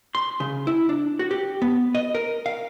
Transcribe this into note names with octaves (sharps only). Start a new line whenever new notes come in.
C6
C#3
E4
D4
F#4
G4
B3
D#5
A#4
F5